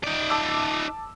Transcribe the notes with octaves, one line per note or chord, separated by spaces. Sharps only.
D#4 D5
A5 D6 E6